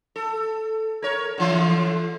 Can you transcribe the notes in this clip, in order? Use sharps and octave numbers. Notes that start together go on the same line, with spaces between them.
A4
A#4 C#5
D3 E3 A3